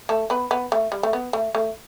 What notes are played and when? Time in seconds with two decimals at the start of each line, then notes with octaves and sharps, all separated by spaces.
0.09 A3 A4
0.30 B3 B4
0.51 B3
0.72 A3
0.92 G3
1.03 A3
1.13 B3
1.33 A3
1.55 A3